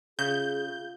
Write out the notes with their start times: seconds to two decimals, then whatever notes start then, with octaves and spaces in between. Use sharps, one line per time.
0.19 C#3 F4 G#4 E5 F5 G6